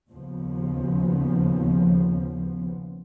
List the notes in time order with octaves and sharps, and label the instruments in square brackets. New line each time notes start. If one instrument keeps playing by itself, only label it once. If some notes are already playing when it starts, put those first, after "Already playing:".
[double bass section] D#2 C#3 F3 B3